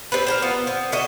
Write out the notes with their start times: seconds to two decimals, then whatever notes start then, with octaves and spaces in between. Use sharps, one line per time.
0.12 C4 G4 B4
0.26 C4 D4 A#4
0.42 B3 F4
0.67 B3 C4
0.92 D3 F#4 D#5 E5